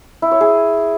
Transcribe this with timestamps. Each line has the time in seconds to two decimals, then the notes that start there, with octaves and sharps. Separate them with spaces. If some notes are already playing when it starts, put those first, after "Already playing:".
0.22 E4
0.31 C#5
0.41 G#4